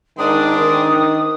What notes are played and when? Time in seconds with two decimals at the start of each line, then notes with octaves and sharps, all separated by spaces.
0.18 G#2 D#3 C4 D4 D#6
0.57 D#3